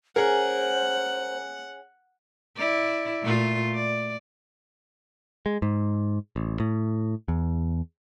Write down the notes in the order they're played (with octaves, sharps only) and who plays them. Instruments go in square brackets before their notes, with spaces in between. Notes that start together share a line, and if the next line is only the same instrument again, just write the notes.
[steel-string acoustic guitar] C#4 G#4 [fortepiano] A#4 [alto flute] C5 [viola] F#5
[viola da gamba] E4 D5
A#2 A3 F4
D5
[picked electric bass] G#3
G#2
A1
A2
E2